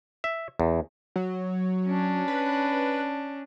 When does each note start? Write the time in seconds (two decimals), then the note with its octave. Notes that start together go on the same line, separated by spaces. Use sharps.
0.24 E5
0.60 E2
1.16 F#3
1.85 C#4 D4
2.28 B4